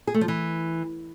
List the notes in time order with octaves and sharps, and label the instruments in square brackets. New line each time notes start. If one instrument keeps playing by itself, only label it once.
[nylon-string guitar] G#4
A3
F3
E3